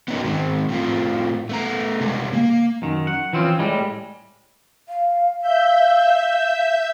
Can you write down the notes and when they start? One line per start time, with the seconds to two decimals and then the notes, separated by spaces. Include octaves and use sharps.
0.08 B3 C#4 D#4 E4 F#4 A#4
0.24 G#2 D#3 C4
0.69 A2 C4 F4
1.49 A3 B3 A#5
2.01 C#3 G3 G#3
2.33 A#3
2.82 F#2 D#3
3.07 F#5
3.33 E3 F3 C4 C#4 F4
3.59 A2 G3 G#3
4.89 F5
5.41 E5 F5 G6